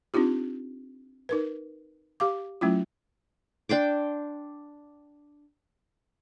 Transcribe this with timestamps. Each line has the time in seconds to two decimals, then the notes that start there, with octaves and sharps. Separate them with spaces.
0.14 C4 D4 D#4 F4 G4
1.29 D#4 A#4 B4
2.20 G4 F5 D6
2.61 F#3 A3 C#4 E4 F4
3.69 D4 G5 C6 D6